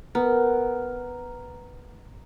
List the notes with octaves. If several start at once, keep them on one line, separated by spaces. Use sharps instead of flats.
B3 A#4